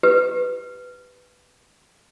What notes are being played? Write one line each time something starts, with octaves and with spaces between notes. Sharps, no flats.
G4 B4